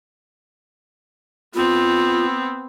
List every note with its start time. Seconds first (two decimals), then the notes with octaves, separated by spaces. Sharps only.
1.55 B3 C4 F4